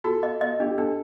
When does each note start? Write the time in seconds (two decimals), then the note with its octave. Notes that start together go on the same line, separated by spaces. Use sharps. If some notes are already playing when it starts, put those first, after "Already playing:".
0.04 F#4 A4
0.23 D#5
0.41 D#5
0.60 D4 G4
0.78 D4 A4